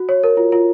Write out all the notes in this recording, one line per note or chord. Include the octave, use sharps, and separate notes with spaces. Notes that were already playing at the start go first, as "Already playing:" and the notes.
Already playing: F#4
C#5
A#4
F4
F4